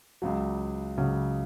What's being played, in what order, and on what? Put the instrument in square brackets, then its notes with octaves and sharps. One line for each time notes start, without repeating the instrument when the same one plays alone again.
[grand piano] C#2 C#3 F#3
C#2 C#3 F#3